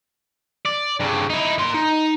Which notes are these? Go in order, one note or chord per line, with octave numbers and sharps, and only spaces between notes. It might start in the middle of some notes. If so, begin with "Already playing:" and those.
D5
G2 C#3
D#4 E4
A#3 C6
D#4